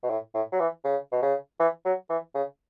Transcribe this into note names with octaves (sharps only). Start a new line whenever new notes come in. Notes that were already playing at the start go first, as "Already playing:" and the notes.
B2
A2
A2
F#3
E3
C#3
B2
C#3
E3
F#3
E3
C#3